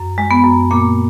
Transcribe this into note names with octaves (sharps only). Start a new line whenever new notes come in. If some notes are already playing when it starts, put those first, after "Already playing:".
Already playing: F#2
G#3
B3
F#2
A#2 A#3